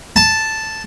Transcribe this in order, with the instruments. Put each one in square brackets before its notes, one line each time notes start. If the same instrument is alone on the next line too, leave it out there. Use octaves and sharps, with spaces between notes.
[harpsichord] A5